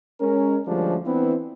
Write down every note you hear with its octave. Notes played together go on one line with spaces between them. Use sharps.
G#3 C#4 A#4
D2 F3 G3 G#3 C#4 D4
E3 B3 C4 D4 E4